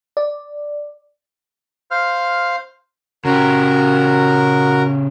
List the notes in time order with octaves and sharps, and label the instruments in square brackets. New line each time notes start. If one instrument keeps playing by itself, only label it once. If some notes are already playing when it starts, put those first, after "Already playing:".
[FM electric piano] D5
[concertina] C5 F5 F6
[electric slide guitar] C#3 G4 [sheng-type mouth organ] F#4 A#4 A#5